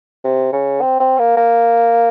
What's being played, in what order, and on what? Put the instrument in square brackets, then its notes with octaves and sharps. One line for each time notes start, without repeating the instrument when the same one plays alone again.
[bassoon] C3
C#3
C4
C4
A#3
A#3